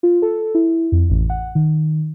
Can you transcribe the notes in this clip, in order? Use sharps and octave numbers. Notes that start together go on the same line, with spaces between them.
F4
A4
E4
F2
A1
F#5
D#3